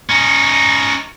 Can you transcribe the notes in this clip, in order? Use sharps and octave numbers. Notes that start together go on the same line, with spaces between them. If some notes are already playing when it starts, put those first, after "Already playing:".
C#4 D#4